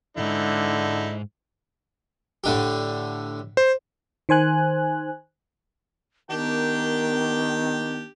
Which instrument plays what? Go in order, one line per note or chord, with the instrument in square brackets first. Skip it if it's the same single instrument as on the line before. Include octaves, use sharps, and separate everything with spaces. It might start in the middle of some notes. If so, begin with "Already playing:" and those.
[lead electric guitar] D#2 G#2 [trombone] D3 [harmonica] D#4 E4
[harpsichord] A2 D3 G4
[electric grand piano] C5
[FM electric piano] D#3 C5 G#5 F#6
[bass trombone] D#3 [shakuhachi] B3 [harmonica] D4 G4 G5 [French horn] A#4